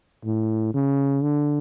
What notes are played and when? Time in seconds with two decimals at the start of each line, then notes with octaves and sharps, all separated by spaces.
0.25 A2
0.74 C#3
1.22 D3